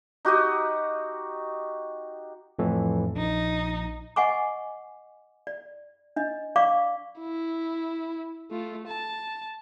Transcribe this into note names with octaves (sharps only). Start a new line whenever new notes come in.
D#4 F#4 G4 D#5
F2 A2 E3
A#1 D#4
D#5 F#5 G#5 C#6 D6
D5
D4 D#5
D5 F5 C#6 D6
E4
A3 F4
A5